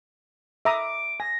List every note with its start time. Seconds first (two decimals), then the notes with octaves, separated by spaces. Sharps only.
0.65 E5 A#5 D6 D#6
1.20 G#5 A#6